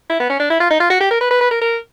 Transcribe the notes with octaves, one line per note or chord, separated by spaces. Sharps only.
E4
B3
C#4
D4
E4
F4
D#4
F4
F#4
G4
A#4
B4
B4
B4
A#4
A#4